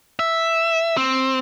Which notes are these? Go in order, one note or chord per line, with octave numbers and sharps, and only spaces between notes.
E5
C4